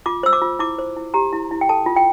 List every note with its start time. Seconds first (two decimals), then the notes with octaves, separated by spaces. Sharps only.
0.06 F4 D6
0.23 C5 E6
0.33 D6
0.42 F4
0.59 E4 D6
0.79 C5
0.97 E4
1.14 G4 A#5
1.33 E4
1.51 E4
1.61 G5
1.69 A4 A5
1.86 F4
1.96 G5